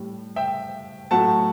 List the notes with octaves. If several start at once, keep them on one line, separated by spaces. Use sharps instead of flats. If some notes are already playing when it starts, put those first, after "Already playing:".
Already playing: A2 G3
E5 G5
A2 F#3 A3 F#5 A5